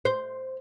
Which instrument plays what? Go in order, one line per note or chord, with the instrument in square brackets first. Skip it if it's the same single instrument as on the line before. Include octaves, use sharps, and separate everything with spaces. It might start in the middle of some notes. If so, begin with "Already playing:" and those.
[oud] C5